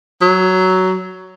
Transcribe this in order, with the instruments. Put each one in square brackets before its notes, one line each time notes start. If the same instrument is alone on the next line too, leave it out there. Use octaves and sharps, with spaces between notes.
[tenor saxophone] F#3